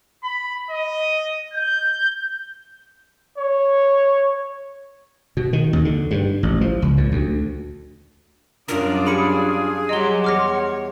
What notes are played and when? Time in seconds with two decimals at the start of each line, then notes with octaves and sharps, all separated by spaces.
0.23 B5
0.71 D#5
1.54 G6
3.38 C#5
5.37 B2
5.53 D#3
5.73 D#2
5.85 D3
6.11 G2
6.43 A1
6.61 F3
6.82 C#2
6.97 A#2
7.12 D2
8.68 F#2 G3 D4 F4 A#4 D5 D#6
9.06 G4 G#4 B5 C#7
9.89 F#3 G3 G4 D#5 F#5 A#5 C6 G7
10.24 E2 C#5 D6 F6 A#6